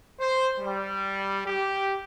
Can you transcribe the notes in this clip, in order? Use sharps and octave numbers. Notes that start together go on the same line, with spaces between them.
C5
G3
G4